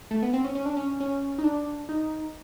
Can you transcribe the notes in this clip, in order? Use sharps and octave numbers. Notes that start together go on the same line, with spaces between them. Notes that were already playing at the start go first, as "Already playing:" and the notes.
A3
B3
C4
C#4
C#4
D4
C#4
C#4
D#4
D4
D#4